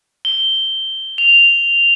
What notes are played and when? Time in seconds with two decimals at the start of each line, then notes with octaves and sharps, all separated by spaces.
0.25 G7
1.18 F7